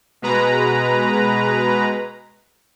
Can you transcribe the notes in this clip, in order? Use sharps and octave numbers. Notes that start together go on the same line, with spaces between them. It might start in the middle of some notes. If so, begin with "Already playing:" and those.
B2 G#3 B4 A#5